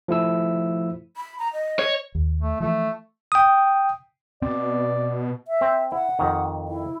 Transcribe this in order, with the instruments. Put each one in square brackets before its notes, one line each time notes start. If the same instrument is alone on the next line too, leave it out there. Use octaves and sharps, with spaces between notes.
[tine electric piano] F3 A3 E4 E6
[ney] B5
A#5
D#5
[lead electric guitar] C#5
[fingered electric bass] D#2
[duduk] A3
[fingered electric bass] E3 F3 [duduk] A3
[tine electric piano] G5 D#6
[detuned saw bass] B2 [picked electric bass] C4 [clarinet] D5
[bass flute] E5
[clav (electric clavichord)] C4
[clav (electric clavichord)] E4 [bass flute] F#5
[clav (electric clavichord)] F2 D#3
[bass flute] E4